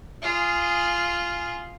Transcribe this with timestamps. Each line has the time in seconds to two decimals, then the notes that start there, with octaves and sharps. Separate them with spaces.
0.22 F4 G#4